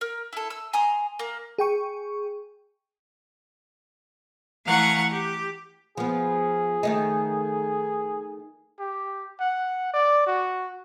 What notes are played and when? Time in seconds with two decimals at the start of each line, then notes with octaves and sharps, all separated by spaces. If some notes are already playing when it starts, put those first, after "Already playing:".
0.01 A#4
0.33 E4 A4
0.50 E6
0.73 G#5 A#5 C6 D#6
1.19 A#3
1.58 G#4 G5 C#6
4.66 E3 A3 F5 F#5 A#5 C#6
5.09 G4
5.97 F3 B3 G#4
6.83 D#3 A3 D#4
8.79 G4
9.40 F#5
9.93 D5
10.26 F#4